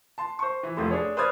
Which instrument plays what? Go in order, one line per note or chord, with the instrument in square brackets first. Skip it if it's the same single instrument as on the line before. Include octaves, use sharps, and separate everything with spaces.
[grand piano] A5 C6
C5 C#6
E3
F1 F3 A3 C6
D4 G#4 C#5
B4 C5 D5 D#6 F6 G#6